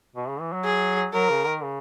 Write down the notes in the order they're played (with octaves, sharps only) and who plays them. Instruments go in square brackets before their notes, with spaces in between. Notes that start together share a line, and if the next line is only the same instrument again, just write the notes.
[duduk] B2
C#3
E3
F#3
[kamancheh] G#4
[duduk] F#3 [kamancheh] A#4
[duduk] C#3
D#3
C#3